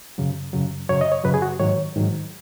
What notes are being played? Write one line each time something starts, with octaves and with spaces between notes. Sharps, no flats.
F#2 C#3 F#3
F#2 C#3 F#3
F#2 C#3 F#3 C#5
D#5
C#5
F#2 C#3 F#3 B4
G#4
F#4
G#2 D#3 F#3 C#5
G#2 D#3 F#3